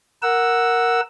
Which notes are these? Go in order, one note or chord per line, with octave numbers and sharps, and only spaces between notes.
A#4 F#5 E6